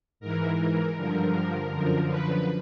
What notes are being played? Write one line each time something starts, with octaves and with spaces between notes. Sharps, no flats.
G#2 E3 A#4
A#4
G2 D3 F3 A#4
F#2 D3 F3
B4